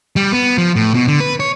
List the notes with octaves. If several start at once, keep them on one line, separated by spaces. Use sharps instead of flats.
G3
B3
F3
A2
B2
D3
B4
C#5